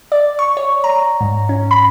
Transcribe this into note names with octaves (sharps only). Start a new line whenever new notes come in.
D5
C#6
C#5
A#5
G#2
C#4
B5